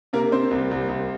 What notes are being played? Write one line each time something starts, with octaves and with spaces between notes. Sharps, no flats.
C3 A#3 A#4
C3 C4 C5
C2
C2
C2